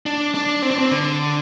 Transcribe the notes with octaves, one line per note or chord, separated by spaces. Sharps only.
D4
D4
C4
D4
C4
D3